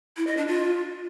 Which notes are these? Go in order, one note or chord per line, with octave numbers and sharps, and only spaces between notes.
E4
D#5
D4
F4